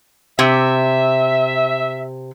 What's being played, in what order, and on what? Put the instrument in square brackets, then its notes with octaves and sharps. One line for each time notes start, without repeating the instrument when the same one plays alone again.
[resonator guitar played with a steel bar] C3 [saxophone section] E5